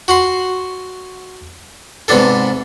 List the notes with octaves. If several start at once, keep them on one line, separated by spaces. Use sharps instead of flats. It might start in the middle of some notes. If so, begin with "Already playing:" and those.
F#4 F#5 C6
G#2 C3 B3 D4 A4